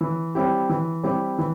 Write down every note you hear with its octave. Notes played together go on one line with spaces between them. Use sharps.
E3
G3 C4 E4 G4
E3
G3 C4 E4 G4
E3